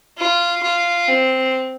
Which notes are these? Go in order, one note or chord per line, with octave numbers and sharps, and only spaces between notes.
F4
F4
C4